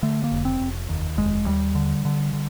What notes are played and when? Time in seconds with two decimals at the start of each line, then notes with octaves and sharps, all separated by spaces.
0.02 D3 A3
0.24 A#3
0.32 F1
0.45 C4
0.60 F1
0.89 D#2
1.17 F1 G#3
1.47 D#2 G3
1.75 D3
2.05 D3
2.33 D3